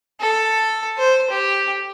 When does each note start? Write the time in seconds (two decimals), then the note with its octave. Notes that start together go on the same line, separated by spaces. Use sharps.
0.20 A4
0.98 C5
1.30 G4